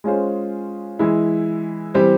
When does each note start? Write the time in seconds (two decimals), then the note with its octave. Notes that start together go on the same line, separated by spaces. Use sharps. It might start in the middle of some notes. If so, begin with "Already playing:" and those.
0.04 G#3 C#4 F4 G#4 C5
0.99 E3 G#3 E4
1.94 E3 G3 C4 G4 C5